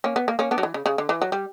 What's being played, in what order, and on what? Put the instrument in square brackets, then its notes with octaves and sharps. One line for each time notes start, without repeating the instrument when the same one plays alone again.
[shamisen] A#3 C#4
B3
A#3
A#3 C#4
B3 D4
F#3
E3
C#3
C#3
D3
E3
F#3
G3